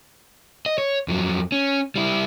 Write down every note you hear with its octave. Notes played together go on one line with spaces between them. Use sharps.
D#5
C#5
F2 F#3
C#4
G3 E4